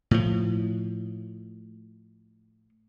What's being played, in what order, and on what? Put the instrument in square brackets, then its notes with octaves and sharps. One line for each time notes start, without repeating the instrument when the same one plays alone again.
[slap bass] A2 F3